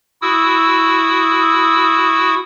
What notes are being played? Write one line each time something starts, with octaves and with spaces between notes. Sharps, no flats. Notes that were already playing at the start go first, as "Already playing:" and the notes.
E4 F#4 D#6 E6